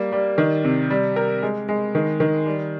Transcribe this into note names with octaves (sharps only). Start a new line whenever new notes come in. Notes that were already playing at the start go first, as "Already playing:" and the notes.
Already playing: G3 A#3
G3
D#3
C3
G3
A#4
G#3
G#3
D#3
D#3
G3